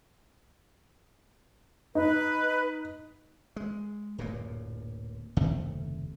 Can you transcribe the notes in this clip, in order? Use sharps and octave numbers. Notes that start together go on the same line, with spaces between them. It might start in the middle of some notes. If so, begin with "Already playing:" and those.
D#4 B4
G#3
D1 F#2 A#2 A#3
F#1 D#2 C3 A3